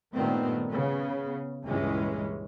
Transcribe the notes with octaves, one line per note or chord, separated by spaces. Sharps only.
G2 A#2 D#3 A3 B3 C4
C#3 B3
C#2 G2 A#2 E3 G#3 C#4